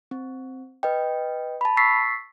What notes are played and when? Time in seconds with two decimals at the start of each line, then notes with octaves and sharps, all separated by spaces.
0.11 C4
0.83 B4 D#5 G5
1.61 A5 B5
1.77 C#6 E6 A6 B6 C7